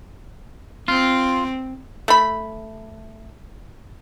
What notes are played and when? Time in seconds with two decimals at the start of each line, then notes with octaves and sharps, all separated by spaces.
0.88 C4 F4
2.08 A3 B5